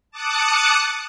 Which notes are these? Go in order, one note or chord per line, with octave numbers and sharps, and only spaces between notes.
A5 D6 D#6 F#6 C#7